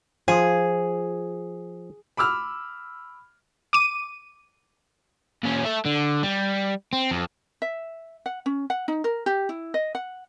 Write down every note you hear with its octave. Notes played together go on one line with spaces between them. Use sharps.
F3 G#4
B5 D6 E6 F6
D6 D#7
A#2 C#4
A4 E5
D3
G3
C4
F2
E5
F#5
C#4
F#5
D#4
A#4
G4
E4
D#5
F#5